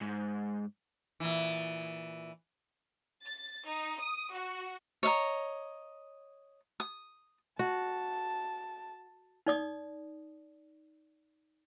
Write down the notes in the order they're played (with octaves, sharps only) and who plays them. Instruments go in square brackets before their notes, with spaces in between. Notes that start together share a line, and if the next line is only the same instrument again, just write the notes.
[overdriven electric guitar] G#2
[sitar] A#2 E3
[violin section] A6
D#4
D#6
F#4
[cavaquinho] C#5 D#5 E5 A#5
D#6
[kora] F#4 [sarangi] A5
[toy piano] D#4 D5 D#6